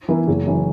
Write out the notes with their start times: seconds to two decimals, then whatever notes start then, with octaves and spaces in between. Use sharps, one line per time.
0.08 E3 B3 E4 A#4
0.28 F#1
0.46 F#2 E3